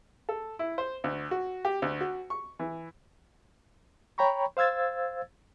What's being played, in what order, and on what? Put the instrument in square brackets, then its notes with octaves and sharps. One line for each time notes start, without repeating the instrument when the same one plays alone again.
[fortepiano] A4
E4
C5
D2
F#4
G4
D2
F#4
C#6
E3
[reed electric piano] C#5 G5 A#5 B5 C#6
C5 F5 E6 G#6 A6